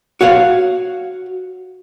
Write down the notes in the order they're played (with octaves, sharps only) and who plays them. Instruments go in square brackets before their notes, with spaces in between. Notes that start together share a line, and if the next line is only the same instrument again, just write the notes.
[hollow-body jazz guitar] F#4 C#5 F5 F#5